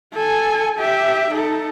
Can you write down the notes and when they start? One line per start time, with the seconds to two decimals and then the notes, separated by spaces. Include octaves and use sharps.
0.14 A4 G#5
0.79 G4 E5
1.30 D#4 A4